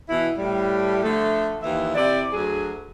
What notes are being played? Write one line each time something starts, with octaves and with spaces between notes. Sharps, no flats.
B2 E3 E4
A2 G3
D3 F3 A3
D#2 E3 F3 E5
C3 E4 D5
D2 F#3 G#4